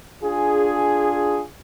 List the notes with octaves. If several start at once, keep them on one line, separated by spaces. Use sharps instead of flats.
D4 F4 G#4